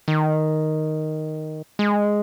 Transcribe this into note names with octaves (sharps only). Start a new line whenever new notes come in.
D#3
G#3